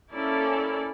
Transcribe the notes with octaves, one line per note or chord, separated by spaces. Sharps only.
A#3 C#4 E4 A4 D5